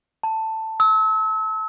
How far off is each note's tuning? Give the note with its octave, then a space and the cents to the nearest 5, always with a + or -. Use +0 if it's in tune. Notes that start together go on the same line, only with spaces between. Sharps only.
A5 +10
E6 -35